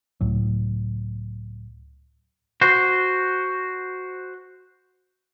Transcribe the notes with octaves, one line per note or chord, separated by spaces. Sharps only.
C#2 A2 F#3
F#4 C5